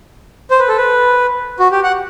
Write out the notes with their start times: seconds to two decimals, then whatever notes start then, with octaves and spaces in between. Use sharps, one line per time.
0.51 C5
0.60 B4
0.68 A4
0.77 B4
1.60 F#4
1.72 G4
1.84 F#5